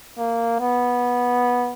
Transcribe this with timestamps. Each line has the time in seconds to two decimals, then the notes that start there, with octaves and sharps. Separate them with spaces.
0.18 A#3
0.60 B3